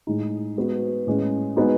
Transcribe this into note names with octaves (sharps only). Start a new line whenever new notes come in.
A2 G#3 D#4
G#3 B3 F#4
A2 G#3 C#4
G#3 B3 D#4 F#4